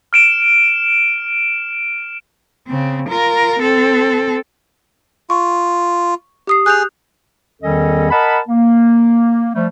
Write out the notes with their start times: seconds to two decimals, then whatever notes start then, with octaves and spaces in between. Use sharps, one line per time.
0.13 F6 D7 E7
2.68 C#3 C4
3.09 F4 A#4
3.59 C4 A4
5.30 F4 C#6
6.47 G4 D#6 C7
6.66 G#4 F#6 G6 F7
7.62 E2 D#3 G3 C#4 A4 D#5
8.11 A#4 D#5 F#5 A5 B5
8.48 A#3
9.55 F3 G3 A3